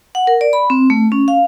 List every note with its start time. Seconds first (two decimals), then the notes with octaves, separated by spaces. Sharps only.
0.15 F#5
0.27 A#4
0.41 D5
0.53 B5
0.70 C4
0.90 A3
1.12 C#4
1.28 F5